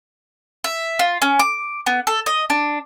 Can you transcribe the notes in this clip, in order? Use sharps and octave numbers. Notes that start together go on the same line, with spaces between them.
E5
F4
C#4
D6
B3
A4
D#5
D4